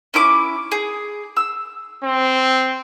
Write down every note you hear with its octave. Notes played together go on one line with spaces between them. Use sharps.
C#4 E4 D6
G#4
E6
C4